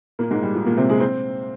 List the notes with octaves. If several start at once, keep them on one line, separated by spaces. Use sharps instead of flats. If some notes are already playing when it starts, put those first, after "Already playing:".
A#2 A#3
G#2 G#3
G3
F3
A#2 A#3
C3 C4
G#3 G#4
C4 C5